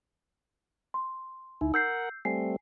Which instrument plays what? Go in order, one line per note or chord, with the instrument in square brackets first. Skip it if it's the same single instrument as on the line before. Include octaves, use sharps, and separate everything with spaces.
[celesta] C6
[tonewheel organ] D2 E4 [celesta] D#4
[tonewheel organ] A#4 F#5 [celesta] E6 G6 C7
[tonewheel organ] G3 A3 C4 [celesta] G#5 C7